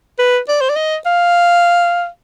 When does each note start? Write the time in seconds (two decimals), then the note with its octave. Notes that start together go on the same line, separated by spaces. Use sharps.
0.19 B4
0.48 D5
0.61 C5
0.70 D5
0.76 D#5
1.06 F5